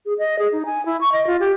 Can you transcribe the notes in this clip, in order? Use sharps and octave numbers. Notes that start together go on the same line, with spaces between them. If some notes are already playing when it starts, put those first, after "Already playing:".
G#4
D#5
G#4
D#4
G#5
E4
C#6
D#5
F4
G4